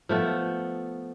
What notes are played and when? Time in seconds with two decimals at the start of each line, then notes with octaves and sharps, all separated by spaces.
0.09 F3 A3 B3